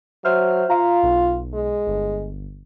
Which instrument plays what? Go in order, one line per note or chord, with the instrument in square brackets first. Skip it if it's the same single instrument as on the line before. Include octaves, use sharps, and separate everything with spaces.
[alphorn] F#3 [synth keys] C5 E5 F6
[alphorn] F4 [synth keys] F5 A#5
[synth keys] B1
[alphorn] G#3
[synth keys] G1